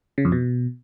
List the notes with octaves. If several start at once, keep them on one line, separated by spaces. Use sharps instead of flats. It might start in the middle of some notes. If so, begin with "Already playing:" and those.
C#3
F2
B2